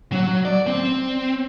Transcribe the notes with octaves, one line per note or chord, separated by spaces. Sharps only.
F#3
D5
C4